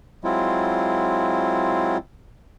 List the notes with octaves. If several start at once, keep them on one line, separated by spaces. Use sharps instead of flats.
F#3 G#3 C4 E4 F4